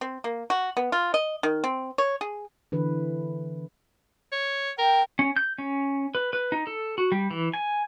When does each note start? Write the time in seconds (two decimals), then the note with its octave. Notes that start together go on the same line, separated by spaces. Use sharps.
0.01 C4
0.24 A#3
0.50 F#4
0.77 B3
0.92 F4
1.14 D#5
1.43 D#3
1.64 C4
1.98 C#5
2.21 G#4
2.72 D3 E3 B4
4.32 C#5
4.78 A#4 G5
5.19 C#4
5.37 G6
5.58 C#4
6.15 B4
6.33 B4
6.52 D#4
6.67 A4
6.98 F#4
7.12 G3
7.31 E3
7.54 G#5